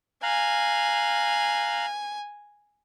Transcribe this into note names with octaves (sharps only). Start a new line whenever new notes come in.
F5 G#5 A#5 F#6